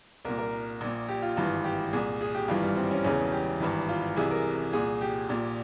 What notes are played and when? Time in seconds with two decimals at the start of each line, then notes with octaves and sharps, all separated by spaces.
0.25 C2 A#2 A#4
0.38 A#4
0.81 A#1 A#2
1.08 G4
1.22 F4
1.36 G#1 G2 E3 F4
1.64 G4
1.93 C2 A#2 G#4
2.21 G#4
2.35 G4
2.48 G#1 G2 E3 F4
2.63 G3
2.76 C4
2.91 C#4
3.04 E1 E2 C#3 E3 C#4
3.32 G4
3.60 G#1 G2 E3
3.89 F4
4.16 C2 C3 E3 G#4
4.31 A#4
4.73 C2 A#2 G#4
5.01 G4
5.29 A#1 A#2